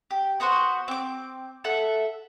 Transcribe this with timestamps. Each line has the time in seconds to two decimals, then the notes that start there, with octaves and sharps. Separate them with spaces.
0.11 G4
0.40 B3 F#4 C5 F#5
0.88 C4 D6
1.64 A4 E5 F#5